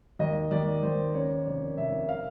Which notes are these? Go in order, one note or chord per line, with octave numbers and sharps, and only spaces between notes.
D#2 D#5
D#2 D5
D#2 C5
C#3 C#5
F1 D5
F1 E5
F5